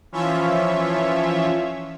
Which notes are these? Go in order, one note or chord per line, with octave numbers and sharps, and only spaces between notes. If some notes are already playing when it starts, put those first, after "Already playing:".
E3 F3 C#4 F4 C#5 E5